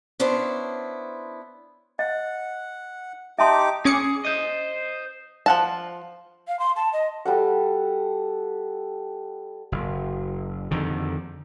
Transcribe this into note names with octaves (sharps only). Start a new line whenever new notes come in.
B3 C#4 D4 E4 C5
D#5 F#5
D#4 G4 E5 A5 C6 D6
C#4 G#4 D6 C#7
C5 D#5
F3 F#5 A5
F5
C6
A5
D#5
G3 A4 F#5
F#1
F2 D3 D#3